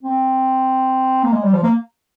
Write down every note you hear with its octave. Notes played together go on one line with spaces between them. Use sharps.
C4
A#3
G#3
G3
F3
A#3